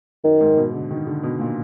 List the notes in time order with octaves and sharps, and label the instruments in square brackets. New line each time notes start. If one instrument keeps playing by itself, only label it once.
[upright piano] F#2 [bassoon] D#3
[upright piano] G#2
B2
D3
D#3
D3
B2
A#2